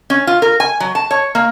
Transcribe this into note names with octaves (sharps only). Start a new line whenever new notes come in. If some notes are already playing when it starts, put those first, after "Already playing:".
C#4
F4
A#4
G#5
F#3
A5
C#5
A#3